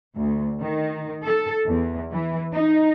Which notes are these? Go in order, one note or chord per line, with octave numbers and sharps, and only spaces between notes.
D2
D#3
A4
E2
E3
D#4